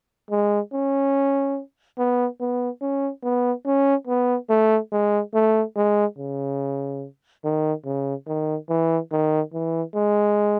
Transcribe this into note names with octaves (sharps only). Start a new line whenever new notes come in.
G#3
C#4
B3
B3
C#4
B3
C#4
B3
A3
G#3
A3
G#3
C#3
D#3
C#3
D#3
E3
D#3
E3
G#3